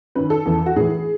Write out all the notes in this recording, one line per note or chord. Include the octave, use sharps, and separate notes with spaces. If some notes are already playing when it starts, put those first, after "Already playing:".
F#2 D#3 B4
A4
E2 C#3 E3
F#4
A2 E3 G#4